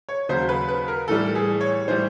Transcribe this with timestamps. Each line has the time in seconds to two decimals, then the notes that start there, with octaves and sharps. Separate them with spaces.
0.09 C#5
0.29 D#2 C#3 F#3 C5
0.49 B4
0.69 B4
0.88 A#4
1.08 A2 E3 G3 A4
1.35 G#4
1.61 C#5
1.88 A2 E3 G3 C5